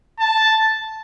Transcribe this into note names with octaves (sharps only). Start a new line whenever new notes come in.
A5